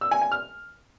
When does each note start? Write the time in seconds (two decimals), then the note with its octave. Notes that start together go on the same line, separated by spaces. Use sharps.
0.01 E6
0.11 G#5
0.21 G#5
0.32 F6